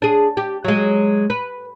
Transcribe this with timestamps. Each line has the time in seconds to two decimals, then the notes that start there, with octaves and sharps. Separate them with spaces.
0.02 D4 G#4
0.37 G4
0.64 F#3 G#3
1.30 B4